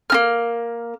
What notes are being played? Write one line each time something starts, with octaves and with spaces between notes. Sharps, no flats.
A#3 D#4 F6